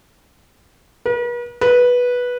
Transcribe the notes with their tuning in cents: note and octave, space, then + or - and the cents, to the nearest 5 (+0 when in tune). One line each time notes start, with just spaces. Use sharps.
B4 -45
B4 -10